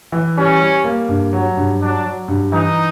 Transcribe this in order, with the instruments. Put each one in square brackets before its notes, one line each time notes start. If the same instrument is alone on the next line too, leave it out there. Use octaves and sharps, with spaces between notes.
[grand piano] E3
[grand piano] G3 [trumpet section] C#4
[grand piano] G3
A#3
G2
F#3
G2
[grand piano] F#3 [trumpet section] D4
[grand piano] F#3
G2
[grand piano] E3 [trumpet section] D#4